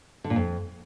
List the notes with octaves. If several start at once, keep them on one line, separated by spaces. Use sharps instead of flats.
D3
A#2
F2